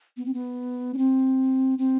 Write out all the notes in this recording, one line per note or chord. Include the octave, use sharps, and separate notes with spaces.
B3
C4
B3
C#4
C4
C4